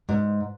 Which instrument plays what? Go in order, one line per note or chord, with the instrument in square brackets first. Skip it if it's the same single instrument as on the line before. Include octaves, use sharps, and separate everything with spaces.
[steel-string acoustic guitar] G#2